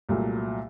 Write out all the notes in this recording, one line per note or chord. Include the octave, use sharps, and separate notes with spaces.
C2 A#2 F#3 A3